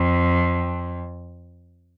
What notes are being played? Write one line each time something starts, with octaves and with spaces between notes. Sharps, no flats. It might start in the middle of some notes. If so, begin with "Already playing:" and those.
Already playing: F2